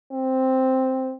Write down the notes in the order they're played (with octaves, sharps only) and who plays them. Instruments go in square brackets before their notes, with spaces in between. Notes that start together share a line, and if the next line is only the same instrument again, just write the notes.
[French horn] C4